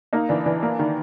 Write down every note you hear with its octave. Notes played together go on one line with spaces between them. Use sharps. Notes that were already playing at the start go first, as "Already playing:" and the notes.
A#3 D#4
E3 D4
E3 D4
A#3
D#3